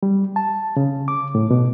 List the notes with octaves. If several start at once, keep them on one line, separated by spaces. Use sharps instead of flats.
G3
A5
C#3
D6
A2
B2